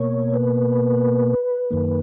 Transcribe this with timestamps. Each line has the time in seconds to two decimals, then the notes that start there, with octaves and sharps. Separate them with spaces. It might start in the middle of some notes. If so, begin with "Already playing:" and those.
Already playing: B2 A#3 C#5
0.34 B4
1.70 F#2 D#3 A#3